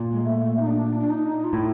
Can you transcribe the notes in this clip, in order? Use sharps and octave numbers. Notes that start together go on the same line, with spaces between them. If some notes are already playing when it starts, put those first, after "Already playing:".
Already playing: A#2
G#3
A3
D#4
D4
D4
D#4
F4
A2 E4